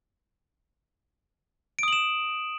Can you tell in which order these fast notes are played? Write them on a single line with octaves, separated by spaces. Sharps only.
D7 D#6 F#7 E7